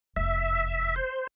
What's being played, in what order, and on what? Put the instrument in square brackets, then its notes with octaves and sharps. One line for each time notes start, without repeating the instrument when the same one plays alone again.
[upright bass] F1 E2 [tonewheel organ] E5
[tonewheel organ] C5